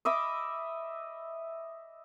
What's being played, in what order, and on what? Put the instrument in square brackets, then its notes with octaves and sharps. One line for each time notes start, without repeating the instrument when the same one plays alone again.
[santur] D#5 E5 B5 D6